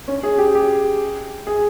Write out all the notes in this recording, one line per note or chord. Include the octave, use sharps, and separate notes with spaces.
C#4
G#4
G4
G4
G#4